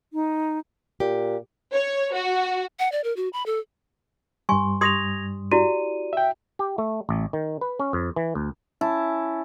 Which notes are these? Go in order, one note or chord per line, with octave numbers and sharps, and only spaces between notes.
D#4
A#2 G4
C#5
F#4
F#5
D5
A#4
F#4
B5
A4
G2 G3 G#5 C6 C#6
G4 C6 D#6 G#6 A#6 F7
E4 F#4 G4 D5 D#7
E5 G5
G4
A3
A1
D#3
B4
C#4
F2
E3
D2
C#4 E4 A5